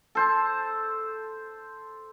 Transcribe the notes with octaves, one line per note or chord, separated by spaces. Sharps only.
A4 C5 A5